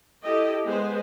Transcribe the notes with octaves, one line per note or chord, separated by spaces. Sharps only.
E4 G4 A4 D#5 G5
G#3 B3 G#4 B4 C5